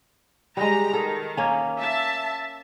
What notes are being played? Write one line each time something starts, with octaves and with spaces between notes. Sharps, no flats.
G3 G#3 G4 A#5
D#3 A4
A#3 C#4
E5 A5